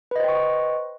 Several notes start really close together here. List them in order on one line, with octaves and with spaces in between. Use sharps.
B4 D#5 C5 G5 C#6